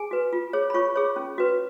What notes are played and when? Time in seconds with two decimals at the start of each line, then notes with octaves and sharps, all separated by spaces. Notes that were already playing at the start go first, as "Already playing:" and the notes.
Already playing: G#4 G#5
0.11 F#4 B4
0.33 F4
0.53 G#4 C#5
0.70 B5
0.74 F4 C#5 C#6
0.96 G#4 C#5
1.16 C#4
1.38 F#4 B4